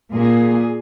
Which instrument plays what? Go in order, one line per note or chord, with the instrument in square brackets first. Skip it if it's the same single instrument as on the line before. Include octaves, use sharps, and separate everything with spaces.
[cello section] A#2 A#3 G#4